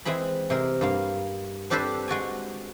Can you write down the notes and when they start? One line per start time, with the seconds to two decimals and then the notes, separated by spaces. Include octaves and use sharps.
0.05 E3 G#3 C4 G#4 B5
0.50 C3 G#3 A#4
0.81 G2 A#3 F5
1.70 C4 D4 G4 A4 B4 C5
2.08 G#3 F#4 D5 G#5